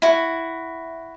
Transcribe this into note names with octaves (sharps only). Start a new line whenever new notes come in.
E4 F#4